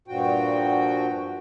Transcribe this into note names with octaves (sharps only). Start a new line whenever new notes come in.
G2 A#2 F3 F#4 G5